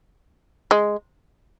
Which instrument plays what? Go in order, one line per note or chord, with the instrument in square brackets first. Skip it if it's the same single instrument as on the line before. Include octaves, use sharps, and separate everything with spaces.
[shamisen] G#3